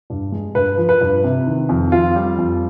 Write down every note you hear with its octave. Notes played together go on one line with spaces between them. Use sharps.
G2
G#3
G2 B4
F3
B4
G2
C3
D#3
F2
F2 F4
G3
F2